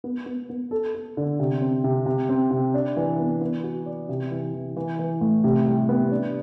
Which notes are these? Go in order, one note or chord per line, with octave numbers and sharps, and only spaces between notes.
B3
B3
B3
A4
A4
D3
C3
C4
C3
C3
C4
C3
D4
E3
B3
B3
F#4
D5
C3
E3
E3
E3
E3
A2
C3
G3
B3
D4